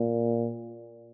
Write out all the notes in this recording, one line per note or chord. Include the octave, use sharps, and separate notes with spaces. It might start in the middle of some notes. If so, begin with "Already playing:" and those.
Already playing: A#2